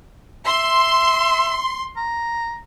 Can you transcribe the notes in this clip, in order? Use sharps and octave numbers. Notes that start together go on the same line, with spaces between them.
E5 C6
A#5